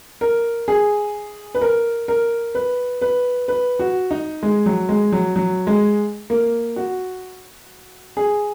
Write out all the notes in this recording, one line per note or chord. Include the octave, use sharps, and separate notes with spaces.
A#4
G#4
B4
A#4
A#4
B4
B4
B4
F#4
D#4
G#3
F#3
G#3
F#3
F#3
G#3
A#3
F#4
G#4